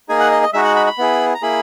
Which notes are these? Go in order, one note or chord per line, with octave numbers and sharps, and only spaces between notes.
A#3 D#4 G#4 G#5
F#5
D#5
D#5
G#3 D#4 F#4 E5
F#5
B5
B5
B3 E4 G#4
A#5
A#3 E4 G#4 B5